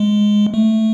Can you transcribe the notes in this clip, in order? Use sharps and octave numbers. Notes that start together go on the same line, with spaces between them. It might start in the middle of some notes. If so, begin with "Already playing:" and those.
Already playing: G#3
A3